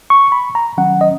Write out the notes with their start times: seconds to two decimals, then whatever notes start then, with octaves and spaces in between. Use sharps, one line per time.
0.10 C#6
0.32 B5
0.55 A#5
0.77 D#3 F#3 C#4 F#5
1.01 D#5